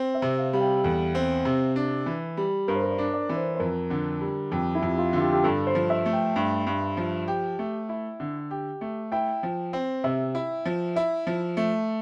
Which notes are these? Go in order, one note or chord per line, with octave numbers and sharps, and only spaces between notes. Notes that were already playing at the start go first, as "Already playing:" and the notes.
Already playing: C4 C5
E5
C3
F5
G3 F5
G5
E2 A4
C4
C3
D4
E3
G3
G2 A#4
C5
A#4
D5
D4
D5
E3
C5
C5
F2 A#4
D3
G3
F2 G4
E4
F2
F4
D3 F4
G4
G4
G2 A4
C5
F3
E5
A3
G5
G2
G2
F3
G4
A3
E4
D3
G4
A3
E4 G5
F3
C4
C3 E5
E4
F3
E4 E5
F3
A3